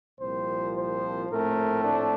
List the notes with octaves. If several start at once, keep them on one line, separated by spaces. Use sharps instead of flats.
C2 A#2 F3 C4 C5
C5
A#1 A2 A3 C4 A#4
D4